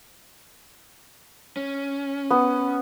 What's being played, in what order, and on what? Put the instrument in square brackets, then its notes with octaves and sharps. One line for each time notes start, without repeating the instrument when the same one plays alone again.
[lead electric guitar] C#4
[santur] B3